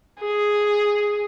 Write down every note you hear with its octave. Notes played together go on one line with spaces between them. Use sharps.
G#4